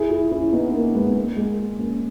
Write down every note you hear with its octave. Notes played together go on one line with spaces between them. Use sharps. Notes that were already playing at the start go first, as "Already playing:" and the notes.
Already playing: E4 G#4
E4 G#4
C#4 E4
B3 D#4
B3
A#3 C#4
G#3 B3
B3
A#3
G#3
A#3
A#3 C#4